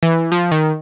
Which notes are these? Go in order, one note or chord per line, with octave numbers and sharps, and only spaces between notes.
E3
F3
D#3